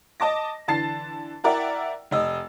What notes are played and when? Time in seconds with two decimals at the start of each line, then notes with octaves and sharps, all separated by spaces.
0.20 D#5 A5 D6 A#6
0.68 D3 E3 A5 A6 C7
1.44 E4 A#4 D5 E5 F#5 G5
2.11 F1 D#5 E6